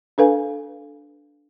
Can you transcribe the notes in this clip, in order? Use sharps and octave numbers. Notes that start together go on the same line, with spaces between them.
D4 A4 B4 F5 G#5